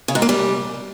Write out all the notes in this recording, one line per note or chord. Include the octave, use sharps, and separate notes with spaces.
C#3
G#2
A#3
G3